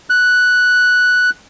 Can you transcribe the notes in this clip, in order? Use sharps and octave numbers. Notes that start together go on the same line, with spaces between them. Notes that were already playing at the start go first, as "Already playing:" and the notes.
F#6